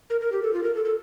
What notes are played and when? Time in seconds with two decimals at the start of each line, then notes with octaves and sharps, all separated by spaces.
0.10 A#4
0.21 A#4
0.32 G4
0.42 A4
0.53 F4
0.63 A#4
0.75 A4
0.85 A4